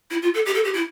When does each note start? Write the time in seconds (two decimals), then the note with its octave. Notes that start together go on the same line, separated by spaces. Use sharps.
0.10 E4
0.22 F4
0.34 A4
0.46 G4
0.55 A4
0.64 G4
0.74 E4